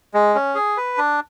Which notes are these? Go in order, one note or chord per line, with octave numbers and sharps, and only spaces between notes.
G#3
C#4
G#4
B4
D4